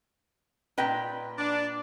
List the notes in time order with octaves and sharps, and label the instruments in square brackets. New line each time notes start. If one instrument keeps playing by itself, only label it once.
[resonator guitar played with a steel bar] A#2 B4 G5
[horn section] D4